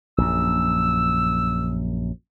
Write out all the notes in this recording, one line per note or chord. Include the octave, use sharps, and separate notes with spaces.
A#1 F#2 E6